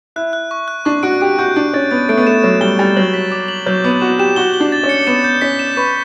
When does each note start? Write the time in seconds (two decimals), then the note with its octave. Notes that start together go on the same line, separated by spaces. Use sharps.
0.16 E4 F#6
0.33 F#6
0.51 C#6
0.68 F#6
0.85 D4 C#6
1.03 F#4 D7
1.21 G4 D7
1.39 F#4 G6
1.56 D4 D7
1.74 C#4 A6
1.91 B3 A6
2.09 A3 D7
2.17 B3
2.27 A3 E7
2.43 F#3 E7
2.61 G3 G7
2.79 G3 A6
2.96 F#3 F#7
3.14 B6
3.32 D6
3.48 F#7
3.66 F#3 G6
3.84 B3 D6
4.01 F#4 E7
4.19 G4 E7
4.36 F#4 G7
4.54 G7
4.60 D4
4.72 A6
4.83 C#4
4.89 C#7
5.07 B3 E7
5.24 G6
5.41 C#4 B6
5.59 E7
5.77 B4 C#6